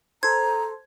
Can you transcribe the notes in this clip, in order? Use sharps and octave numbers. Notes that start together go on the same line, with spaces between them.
A4 C5 A#5 G#6